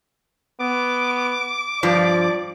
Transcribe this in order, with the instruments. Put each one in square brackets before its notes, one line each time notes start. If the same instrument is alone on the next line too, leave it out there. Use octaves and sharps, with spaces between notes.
[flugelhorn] B3 [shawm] D6
[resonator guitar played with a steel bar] G2 F3 [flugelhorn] D5